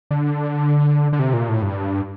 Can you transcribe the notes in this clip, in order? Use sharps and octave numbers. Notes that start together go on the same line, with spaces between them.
D3
D3
C3
A#2
A2
G2